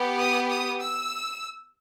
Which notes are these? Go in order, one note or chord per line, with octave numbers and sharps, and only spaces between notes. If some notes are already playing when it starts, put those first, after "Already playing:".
Already playing: B3 G4
D#6
D#6
E6